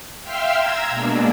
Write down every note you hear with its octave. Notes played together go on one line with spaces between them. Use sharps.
E5 F5 G5 C6 E6 F6
A#5 E6 G#6
B2 G#3 A#3 D4